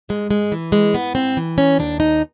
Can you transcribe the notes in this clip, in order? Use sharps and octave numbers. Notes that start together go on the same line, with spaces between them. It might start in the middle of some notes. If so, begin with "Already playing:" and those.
G#2 G#3
G#3
E3
G#3
G#2 B3
C4
E3
C#4
D#2 D4
D#4